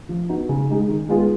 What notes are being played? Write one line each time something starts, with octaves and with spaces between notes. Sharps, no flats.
F3
B3 D#4 F#4
C#3
G#3 D#4 G#4
D#3
G#3 B3 F4 G#4